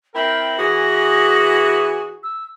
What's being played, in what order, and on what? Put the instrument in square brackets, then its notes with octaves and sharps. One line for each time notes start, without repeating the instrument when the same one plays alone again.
[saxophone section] C4 E4 A#4 [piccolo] G5
[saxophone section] E3 G#4 [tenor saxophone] F#4 [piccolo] A#6
[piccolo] E6